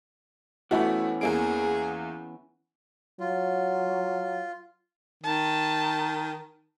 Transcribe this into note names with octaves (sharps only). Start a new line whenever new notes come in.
E3 A3 B3 C#4 E4 F#4
E2 A#3 G#4 D7
F#3 F4
D#3 A5